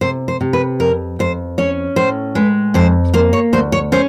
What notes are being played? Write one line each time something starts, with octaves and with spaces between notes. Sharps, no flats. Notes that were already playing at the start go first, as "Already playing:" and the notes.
C3 C5
C5
C3
B4
F2 A#4
F2 C5
C#4 C#5
A2 C5
G#3 B4
F2 C5
A#3 C5
C#5
D2 C5
C#5
C#4 C5